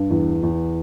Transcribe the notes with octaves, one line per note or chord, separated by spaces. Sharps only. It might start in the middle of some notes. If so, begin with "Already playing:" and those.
Already playing: G2
E2
E2